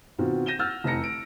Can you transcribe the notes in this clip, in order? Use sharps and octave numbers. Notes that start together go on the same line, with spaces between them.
B2 D#3 C4 F4 F#4
G6 A#6 D#7 E7 G7
F#5 E6 F6 G6 A6
F1 E2 A#5 A#6 C#7
D7